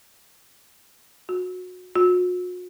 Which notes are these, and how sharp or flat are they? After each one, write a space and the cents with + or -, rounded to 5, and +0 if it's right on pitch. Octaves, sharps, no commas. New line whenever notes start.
F#4 -25
F#4 -45